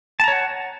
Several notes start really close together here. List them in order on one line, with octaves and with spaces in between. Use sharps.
A5 A#5 C#5 F#5